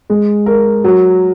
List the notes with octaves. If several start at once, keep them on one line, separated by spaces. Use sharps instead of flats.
G#3
A#4
F#3